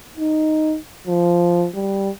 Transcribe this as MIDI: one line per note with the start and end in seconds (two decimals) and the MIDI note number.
0.18 0.77 63
1.07 1.67 53
1.74 2.10 55